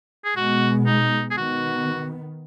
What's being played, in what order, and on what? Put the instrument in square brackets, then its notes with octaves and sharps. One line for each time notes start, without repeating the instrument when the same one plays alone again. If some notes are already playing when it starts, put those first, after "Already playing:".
[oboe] G#4
[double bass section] B2 G#3 B3 [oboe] F#4
[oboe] D#4
G#4
[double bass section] D#3 B3 [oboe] F#4